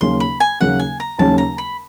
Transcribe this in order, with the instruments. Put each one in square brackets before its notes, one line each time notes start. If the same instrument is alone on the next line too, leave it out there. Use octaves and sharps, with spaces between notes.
[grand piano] D#2 C#3 F#3 A#3 C#4 [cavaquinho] C6
[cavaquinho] B5
G#5
[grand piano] D#2 C#3 F#3 A#3 C#4 [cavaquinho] F#5
[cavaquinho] G#5
A#5
[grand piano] D#2 C#3 F#3 A#3 C#4 [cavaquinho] A5
[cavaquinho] A#5
B5